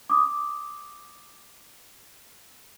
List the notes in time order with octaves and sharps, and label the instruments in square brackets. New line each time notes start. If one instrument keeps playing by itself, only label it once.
[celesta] D6 D#6